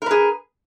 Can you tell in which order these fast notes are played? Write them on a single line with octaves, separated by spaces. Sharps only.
A#4 B4 G#4